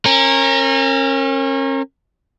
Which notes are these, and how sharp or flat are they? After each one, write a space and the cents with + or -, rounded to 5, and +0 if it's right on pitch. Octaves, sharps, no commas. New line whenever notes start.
C#4 -35 A#4 -15